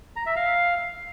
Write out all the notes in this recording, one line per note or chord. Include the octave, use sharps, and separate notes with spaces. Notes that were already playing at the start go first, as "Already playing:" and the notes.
A#5
E5
F5